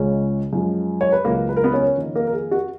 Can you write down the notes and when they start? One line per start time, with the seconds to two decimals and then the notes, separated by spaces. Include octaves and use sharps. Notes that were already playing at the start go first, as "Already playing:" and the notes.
Already playing: C#2 C#3 G#3 C#4
0.53 F#2 F3 G#3
1.01 C#5
1.12 B4
1.25 C#2 C#3 F#3 A#3 A#4
1.49 B4
1.56 A#4
1.64 B3 B4
1.74 C#4 C#5
1.97 F2 D#3 A#3 D#4
2.15 A#3 A#4
2.27 A#4
2.33 G#4
2.51 F#4